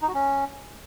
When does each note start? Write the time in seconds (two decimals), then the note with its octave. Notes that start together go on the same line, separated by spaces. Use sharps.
0.02 D#4
0.08 F#4
0.14 C#4